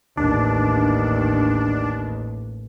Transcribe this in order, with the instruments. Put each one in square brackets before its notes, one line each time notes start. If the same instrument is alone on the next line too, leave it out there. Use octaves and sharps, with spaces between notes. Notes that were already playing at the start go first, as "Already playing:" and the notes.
[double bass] A1 D#2 [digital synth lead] D4